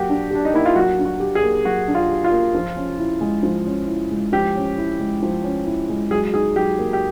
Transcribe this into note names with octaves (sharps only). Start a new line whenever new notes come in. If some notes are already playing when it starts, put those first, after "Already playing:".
Already playing: F#3 A#3 F#4 G4
D4
D4 G4
D#4
A#3 E4
F4
F#3 F#4
D4
F#4
G4
G#4
A#3
F#3 F#4
D4
F4
G4
F4
A#3
F3
C#4
E4
G#3
F3
C#4
E4
G#3
F3 G4
C#4
E4
G#3
F3
C#4
E4
G#3
F#3 G#4
D#4 G#4
F#3 G4
A#3
G4